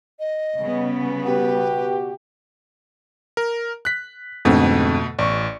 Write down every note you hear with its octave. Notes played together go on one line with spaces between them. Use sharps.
D#5
C#3 G3 B3
B2 F#4 G4 B4
A#4
F#6 B6
F2 G#2 B2 D3 A3
A1 D5 C#6